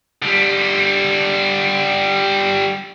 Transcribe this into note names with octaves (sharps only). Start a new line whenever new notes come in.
D3 G3